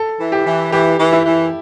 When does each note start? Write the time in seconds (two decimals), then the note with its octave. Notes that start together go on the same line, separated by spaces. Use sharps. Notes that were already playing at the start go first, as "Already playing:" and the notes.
Already playing: A4
0.20 E3
0.32 G4
0.46 E3
0.72 E3 G4
0.99 E3
1.13 E4
1.26 E3